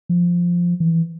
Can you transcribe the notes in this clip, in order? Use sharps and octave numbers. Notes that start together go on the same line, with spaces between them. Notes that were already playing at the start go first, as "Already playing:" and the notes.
F3
E3